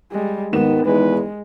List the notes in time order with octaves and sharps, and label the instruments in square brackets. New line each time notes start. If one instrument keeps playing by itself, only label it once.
[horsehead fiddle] G3 G#3
[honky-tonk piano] D#2 G#2 E7 [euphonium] D#3 [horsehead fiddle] B3
[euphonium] E2 [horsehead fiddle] G#3 [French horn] B4